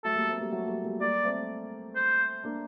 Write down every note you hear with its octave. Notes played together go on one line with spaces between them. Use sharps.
F#3 A3 A4
G3 A#3
A3 C4
G3 A#3
F#3 A3
G3 A#3
G3 A#3
G3 A#3 D5
A3 C4
C5
A#3 D4